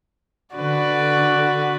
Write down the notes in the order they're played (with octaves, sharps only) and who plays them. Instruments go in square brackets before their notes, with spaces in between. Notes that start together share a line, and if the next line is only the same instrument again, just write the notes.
[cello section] D3 [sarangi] F#4 [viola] B4 D5